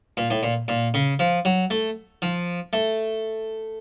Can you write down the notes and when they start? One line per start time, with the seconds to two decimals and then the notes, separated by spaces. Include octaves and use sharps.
0.17 A#2
0.30 A2
0.43 A#2
0.68 A#2
0.94 C#3
1.19 F3
1.45 F#3
1.70 A3
2.22 F3
2.73 A3